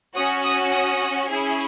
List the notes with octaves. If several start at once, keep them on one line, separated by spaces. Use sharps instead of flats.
C#4 F#4 D#6
D#6
D#6
C#4 E4 G#4